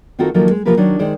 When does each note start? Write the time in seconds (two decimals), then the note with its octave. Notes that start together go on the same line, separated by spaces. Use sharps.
0.19 D#3 C4 F4 F#4 A4 A#4
0.34 D#3 F3 F#3 A#3 A4
0.51 G#3
0.65 C3 F3 A#3 G4 A#4 B4
0.77 D#3 F#3 D4 D#4 C#5
0.99 D#3 G#3 C5 D5